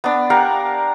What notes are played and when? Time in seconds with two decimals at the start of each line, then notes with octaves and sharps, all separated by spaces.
0.04 B3 D4
0.30 G4 A#4 F5 F#5